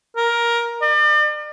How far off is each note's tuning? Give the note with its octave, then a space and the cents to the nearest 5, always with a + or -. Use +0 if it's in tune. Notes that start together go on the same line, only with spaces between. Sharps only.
A#4 +10
D5 +40